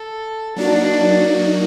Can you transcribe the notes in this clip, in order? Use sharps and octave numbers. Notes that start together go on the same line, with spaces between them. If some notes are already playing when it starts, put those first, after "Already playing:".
Already playing: A4
F#3 A#3 D4 D#4 F#4